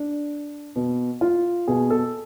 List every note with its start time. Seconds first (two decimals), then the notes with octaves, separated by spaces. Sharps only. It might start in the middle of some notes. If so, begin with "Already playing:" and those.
Already playing: D4
0.76 B2
1.21 F4
1.68 B2 G#4
1.90 A4